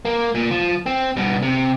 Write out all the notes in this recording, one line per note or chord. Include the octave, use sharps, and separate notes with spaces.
A#3
A#2
F3
C4
G2 B2
C3